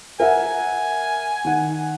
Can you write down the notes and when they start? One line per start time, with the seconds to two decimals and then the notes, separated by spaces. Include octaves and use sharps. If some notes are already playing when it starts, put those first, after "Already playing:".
0.20 A#4 E5 F#5 G#5
1.45 D#3 F#5